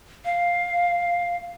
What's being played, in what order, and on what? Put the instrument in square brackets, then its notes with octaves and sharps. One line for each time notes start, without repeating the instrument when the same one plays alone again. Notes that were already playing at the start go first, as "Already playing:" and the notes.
[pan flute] F5